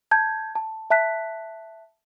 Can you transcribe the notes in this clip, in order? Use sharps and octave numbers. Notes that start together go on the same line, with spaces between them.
A5 G6 G#6
A5
E5 A5 F#6 B6